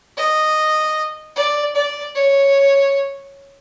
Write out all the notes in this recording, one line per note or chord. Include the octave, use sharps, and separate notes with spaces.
D#5
D5
D5
C#5